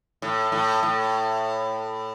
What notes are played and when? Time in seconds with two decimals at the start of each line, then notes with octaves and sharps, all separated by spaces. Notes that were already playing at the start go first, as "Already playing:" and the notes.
0.22 A2
0.52 A2
0.83 A2